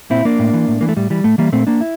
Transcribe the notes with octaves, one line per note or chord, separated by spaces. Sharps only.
A#2 C4 E4
A#3 D4
A2
E3
A2
E3 A#3
A3
A2 G3
E3 G3
A2 A3
E3 G3 A#3
A#2 A3 C4
A#3 D4
E4